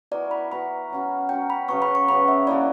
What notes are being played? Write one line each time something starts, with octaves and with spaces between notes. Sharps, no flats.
E3 B3 F#4 A#4 D5
B5
E3 B3 F#4 A#4 B5
F#3 C#4 F#4
F#3 C#4 F#4 G5
B5
C#3 F#3 B3 C#6
B5
C#6
C#3 F#3 B3 B5
E5
E3 A#3 D4 F#4 D5